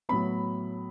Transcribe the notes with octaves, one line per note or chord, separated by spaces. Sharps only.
A2 F#3 B3 B5